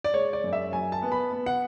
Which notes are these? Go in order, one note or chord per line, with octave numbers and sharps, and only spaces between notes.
D5
G#3 C#5
D5
F#2
E5
F#3 G#5
A5
B3
B5
B3
F#5